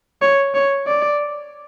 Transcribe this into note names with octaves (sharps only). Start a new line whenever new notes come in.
C#5
C#5
D5